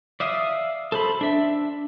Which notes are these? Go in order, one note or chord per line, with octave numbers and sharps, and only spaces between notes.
D5 E5 F5 D#6
A4 C5 B5
D4 E5